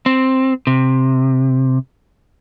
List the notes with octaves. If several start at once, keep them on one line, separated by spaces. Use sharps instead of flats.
C4
C3